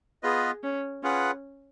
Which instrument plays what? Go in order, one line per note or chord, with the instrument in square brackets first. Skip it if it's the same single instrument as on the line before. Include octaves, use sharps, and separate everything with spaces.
[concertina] B3 F4 B4 D#5 [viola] G#4
[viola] C#4
[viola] C#4 [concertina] F4 G#4 B4 F#5